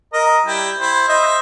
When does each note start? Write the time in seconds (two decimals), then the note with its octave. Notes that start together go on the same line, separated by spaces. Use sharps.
0.13 A#4 D#5 A#5
0.46 G3 E4 G5
0.80 E4 C5
1.08 C5 D#5 E5